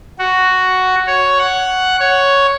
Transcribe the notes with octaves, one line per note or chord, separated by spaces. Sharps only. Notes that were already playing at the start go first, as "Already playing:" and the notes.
F#4
C#5
F#5
C#5